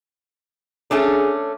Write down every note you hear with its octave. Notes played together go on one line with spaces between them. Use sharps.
A3 C#4 D4 G#4